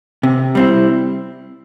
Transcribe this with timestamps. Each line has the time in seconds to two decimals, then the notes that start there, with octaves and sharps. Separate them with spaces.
0.23 C3
0.55 G3 C4 E4